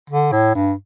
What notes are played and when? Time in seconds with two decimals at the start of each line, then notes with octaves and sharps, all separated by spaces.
0.10 D3
0.32 A2
0.55 G2